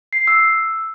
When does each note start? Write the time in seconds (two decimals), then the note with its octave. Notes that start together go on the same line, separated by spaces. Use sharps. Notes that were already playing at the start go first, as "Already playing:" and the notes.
0.13 C7
0.28 E6